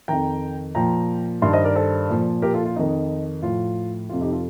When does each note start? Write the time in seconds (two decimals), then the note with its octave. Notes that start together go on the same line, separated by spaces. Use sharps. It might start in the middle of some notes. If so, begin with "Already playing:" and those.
0.08 F2 D#3 G5 A#5
0.75 A#2 F3 G5 A#5
1.42 G2 D#3 A5 C6
1.53 C5 D#5
1.64 A#4 D5
1.75 A4 C5
2.09 A#2 F3
2.42 G4 A#4
2.53 F4 A4
2.65 F4
2.76 F2 D#3 D#4
3.42 A2 F3 F4
4.09 F2 C3 F3 F4
4.21 D#4 G4
4.32 F4 A4